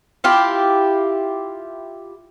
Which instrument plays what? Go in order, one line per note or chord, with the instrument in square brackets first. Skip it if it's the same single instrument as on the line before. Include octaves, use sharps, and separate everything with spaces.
[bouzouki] E4 F4 G4